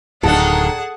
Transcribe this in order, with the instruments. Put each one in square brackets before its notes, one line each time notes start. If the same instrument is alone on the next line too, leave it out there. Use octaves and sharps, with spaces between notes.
[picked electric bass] D1 [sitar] D#3 A#3 D4 [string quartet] G#4 F#5 A5 [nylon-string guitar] A4